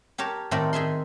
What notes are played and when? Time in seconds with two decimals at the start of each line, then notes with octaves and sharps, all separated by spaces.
0.18 G4 A#4 C#5 A5
0.51 A2 D#3 A3 C4 A#4 D5
0.73 D#3 G#4 E5 C6